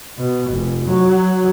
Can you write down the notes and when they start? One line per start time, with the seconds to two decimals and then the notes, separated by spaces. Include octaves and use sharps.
0.18 B2
0.52 F1
0.86 F#3